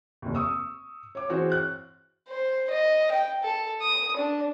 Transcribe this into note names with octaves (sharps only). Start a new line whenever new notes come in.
F1 D#2
C#6 D#6 E6
C#5 D6
E3 C4 F#4 G#4 C#5
F#6
C5
D#5
G5
A4
D#6
D4